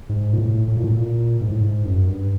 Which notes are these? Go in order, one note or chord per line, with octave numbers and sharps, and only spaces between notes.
G#2
A#2
A2
A2
A#2
A2
A#2
G#2
A2
G#2
F#2
G2